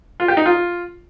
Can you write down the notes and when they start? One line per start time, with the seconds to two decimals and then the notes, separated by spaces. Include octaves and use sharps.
0.20 F4
0.28 G4
0.37 D#4
0.46 F4